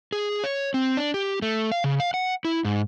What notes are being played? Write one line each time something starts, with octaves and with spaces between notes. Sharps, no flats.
G#4
C#5
C4
D4
G4
A3
F5
C#3
F5
F#5
E4
G#2